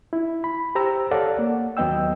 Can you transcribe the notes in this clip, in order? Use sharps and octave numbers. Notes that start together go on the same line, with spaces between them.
E4
B5
G4 C5 A#5 E6
A4 C#5 D5 F5 F#5 A5
A#3
D#2 F#3 B3 D#5 G5 E6